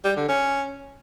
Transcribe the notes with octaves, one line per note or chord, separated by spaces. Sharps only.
G3
D3
C#4